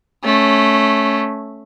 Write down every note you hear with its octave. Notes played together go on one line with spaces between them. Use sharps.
A3 C#4